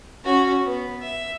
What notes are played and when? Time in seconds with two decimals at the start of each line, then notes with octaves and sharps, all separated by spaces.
0.24 C#4 F#4
0.64 B3
1.01 E5